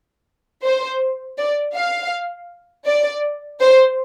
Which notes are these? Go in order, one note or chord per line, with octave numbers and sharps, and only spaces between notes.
C5
D5
F5
D5
C5